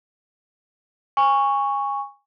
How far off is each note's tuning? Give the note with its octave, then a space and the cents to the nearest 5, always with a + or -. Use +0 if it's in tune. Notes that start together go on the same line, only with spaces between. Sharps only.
G#5 -25 C#6 +0